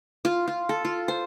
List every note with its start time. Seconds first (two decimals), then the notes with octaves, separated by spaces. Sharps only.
0.25 F4
0.48 F4
0.69 A4
0.85 F4
1.08 C5